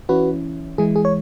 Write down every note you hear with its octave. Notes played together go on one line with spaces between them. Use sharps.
E3 C#4 E4 F#4 B4
E3 G#3 E4 G#4
G#4
C#5